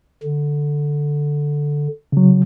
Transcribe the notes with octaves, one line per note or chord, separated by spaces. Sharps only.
D3
C#3 F#3